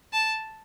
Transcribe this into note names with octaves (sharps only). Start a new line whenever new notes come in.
A5